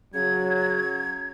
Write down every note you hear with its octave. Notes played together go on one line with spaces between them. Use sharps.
C#3 F#3 G#6